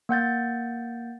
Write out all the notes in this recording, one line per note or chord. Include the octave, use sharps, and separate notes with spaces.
A#3 F#5 G6 A6